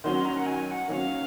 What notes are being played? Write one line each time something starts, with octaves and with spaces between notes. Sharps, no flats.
D#3 F#3 C#4 C6
A#5
F#5
G#5
G#5
F#5
D#3 F#3 C#4 F5 F#5